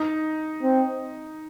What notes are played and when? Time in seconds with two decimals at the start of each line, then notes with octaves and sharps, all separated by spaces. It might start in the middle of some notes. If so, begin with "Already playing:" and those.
Already playing: D#4
0.63 C4